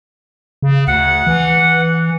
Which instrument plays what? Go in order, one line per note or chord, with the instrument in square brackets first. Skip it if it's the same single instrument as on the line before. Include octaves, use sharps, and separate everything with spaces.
[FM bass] C#3
[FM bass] D2 [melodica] F#5
[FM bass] E3